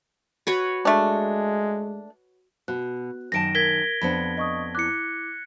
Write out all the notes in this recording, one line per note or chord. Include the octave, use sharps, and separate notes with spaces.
F#4 B4 C#5
G#3 A3 D4
B2 F#4 F#6
F#2 D#3 A5 A#6 D7
A#4 G#6 B6 G7
F2 B3 D4 B5
D#5 C#6 D#6
E4 D6 F#6 C#7